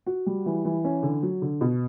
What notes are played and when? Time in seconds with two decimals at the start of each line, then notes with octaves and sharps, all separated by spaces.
0.06 F#4
0.26 G3
0.46 E3
0.65 E3
0.84 C#4
1.03 D3
1.23 F#3
1.42 D3
1.61 B2